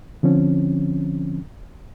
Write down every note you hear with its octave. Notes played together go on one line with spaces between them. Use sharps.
D3 F3 C4 C#4